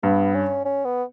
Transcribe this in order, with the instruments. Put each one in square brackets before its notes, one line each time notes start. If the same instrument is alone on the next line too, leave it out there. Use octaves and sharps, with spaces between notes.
[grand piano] G2 [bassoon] B3
[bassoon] C#4
C#4
B3